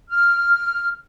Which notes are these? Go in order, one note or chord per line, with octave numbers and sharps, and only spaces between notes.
F6